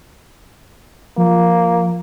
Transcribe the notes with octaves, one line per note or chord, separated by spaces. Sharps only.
F3 A#3